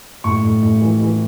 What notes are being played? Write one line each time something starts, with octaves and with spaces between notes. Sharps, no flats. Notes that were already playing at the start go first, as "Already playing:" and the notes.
A2 C#6
A2
A2
E3
E3